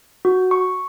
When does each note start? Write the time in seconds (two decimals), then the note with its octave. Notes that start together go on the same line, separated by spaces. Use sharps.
0.25 F#4
0.51 C#6